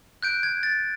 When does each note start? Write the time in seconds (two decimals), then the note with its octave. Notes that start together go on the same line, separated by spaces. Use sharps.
0.23 F#6 G6 D7
0.43 G#6
0.63 A6